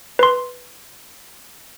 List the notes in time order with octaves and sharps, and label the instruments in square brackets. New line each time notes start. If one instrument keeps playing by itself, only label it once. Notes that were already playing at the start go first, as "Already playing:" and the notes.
[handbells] B4 C6